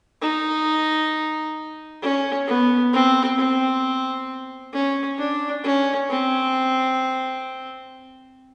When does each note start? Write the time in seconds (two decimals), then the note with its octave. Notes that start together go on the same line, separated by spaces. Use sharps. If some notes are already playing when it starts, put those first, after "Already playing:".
0.21 D#4
2.02 C#4
2.47 B3
2.93 C4
3.37 C4
4.73 C#4
5.18 D4
5.63 C#4
6.09 C4